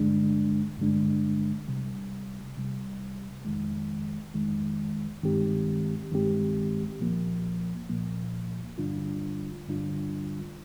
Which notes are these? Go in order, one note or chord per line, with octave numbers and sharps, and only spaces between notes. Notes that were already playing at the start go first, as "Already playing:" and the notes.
Already playing: G2 D3 G#3 D4
G2 D3 G#3 D4
C2 C3 G3
C2 C3 G3
F2 D#3 G#3
F2 D#3 G#3
G2 D#3 G#3 C4 G4
G2 D#3 G#3 C4 G4
C2 A#2 F3 A#3
C2 A#2 F3 A#3
G2 D3 G3 D4 F4
G2 D3 G3 D4 F4